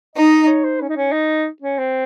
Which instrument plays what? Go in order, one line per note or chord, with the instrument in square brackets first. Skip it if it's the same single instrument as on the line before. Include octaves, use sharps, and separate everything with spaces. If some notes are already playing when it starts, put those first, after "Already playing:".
[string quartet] D#4 [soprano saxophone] D#5
[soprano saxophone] C#5
C5
C#4
D#4
C#4
D#4
C#4
C4